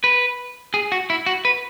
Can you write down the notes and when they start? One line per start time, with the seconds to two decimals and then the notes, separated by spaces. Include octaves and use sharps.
0.04 B4
0.74 G#4
0.92 F#4
1.10 E4
1.26 F#4
1.45 B4